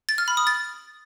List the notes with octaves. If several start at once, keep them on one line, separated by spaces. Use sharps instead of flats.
A6
F6
B5
D#6
A6